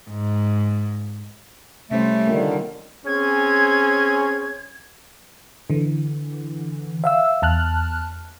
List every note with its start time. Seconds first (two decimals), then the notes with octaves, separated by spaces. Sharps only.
0.11 G#2
1.91 C3 G3 A3 C#4 C5
2.27 D3 D#3 A#3 C4 F4
3.06 C4 C#4 G#4 G#6
5.70 D3 E3
7.04 E5 F5 E6
7.42 E2 A5 F6 F#6